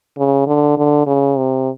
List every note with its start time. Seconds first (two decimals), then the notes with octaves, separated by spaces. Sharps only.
0.18 C#3
0.47 D3
0.78 D3
1.07 C#3
1.38 C3